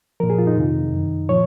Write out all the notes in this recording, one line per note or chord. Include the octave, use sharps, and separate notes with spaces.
A#2 F3 A#4
G#4
F4
D#4
F2 C3 D#3
F#2 D#3
A#2 F3 C#5